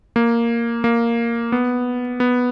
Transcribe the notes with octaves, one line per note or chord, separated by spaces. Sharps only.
A#3
A#3
B3
B3